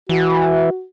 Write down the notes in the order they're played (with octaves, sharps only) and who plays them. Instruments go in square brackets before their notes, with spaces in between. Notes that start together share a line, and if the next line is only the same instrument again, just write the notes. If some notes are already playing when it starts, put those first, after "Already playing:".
[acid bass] E3 [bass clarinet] F#4